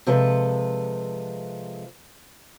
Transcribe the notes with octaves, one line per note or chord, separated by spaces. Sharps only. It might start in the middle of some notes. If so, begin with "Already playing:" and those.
C3 F3 G#3 A4 B4